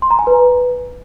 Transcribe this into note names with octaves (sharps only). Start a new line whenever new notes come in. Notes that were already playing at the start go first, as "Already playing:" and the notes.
C6
A#5
G#5
B4